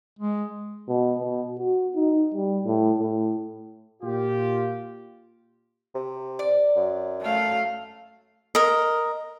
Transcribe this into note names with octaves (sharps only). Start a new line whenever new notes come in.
G#3
B2
B2
F#4
D#4
G3
A2
A2
A#2 F4 G4
C3
D5
F#2
A3 F5
A#4 D#5